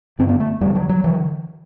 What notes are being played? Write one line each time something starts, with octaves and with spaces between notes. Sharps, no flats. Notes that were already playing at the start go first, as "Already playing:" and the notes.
G2 D3 C4
B3
A3
E2 D3 G3
F#3
F#3
D3 E3